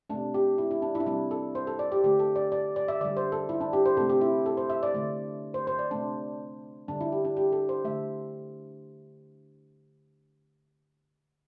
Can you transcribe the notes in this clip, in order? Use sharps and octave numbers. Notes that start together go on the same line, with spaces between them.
C3 A3 D4
G4
E4
E4
D4
E4
D4
C3 G3 E4
A4
C5
A4
D5
G4
D3 A3 G4
A4
D5
D5
D5
E5
D3 G3 D5
C5
A4
E4
D4
G4
C5
C3 A3 A4
G4
E4
A4
C5
E5
D5
D3 A3
C5
C5
D5
C3 A3 D4
D3 G3 D4
E4
G4
D4
G4
A4
C5
D3 A3 E5